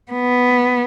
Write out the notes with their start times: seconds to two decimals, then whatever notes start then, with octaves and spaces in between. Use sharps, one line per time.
0.12 B3